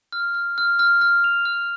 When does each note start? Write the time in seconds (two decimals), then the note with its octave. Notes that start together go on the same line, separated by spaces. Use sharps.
0.12 F6
0.35 F6
0.58 F6
0.79 F6
1.01 F6
1.24 F7
1.45 F6